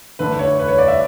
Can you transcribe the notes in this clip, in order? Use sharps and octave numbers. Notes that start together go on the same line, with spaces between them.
D3 A3 D4 B4
C#5
B4
C#5
D5
E5